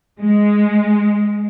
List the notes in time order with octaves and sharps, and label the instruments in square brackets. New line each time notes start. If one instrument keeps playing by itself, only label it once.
[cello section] G#3